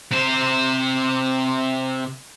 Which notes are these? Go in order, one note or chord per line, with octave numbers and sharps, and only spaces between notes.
C3 C5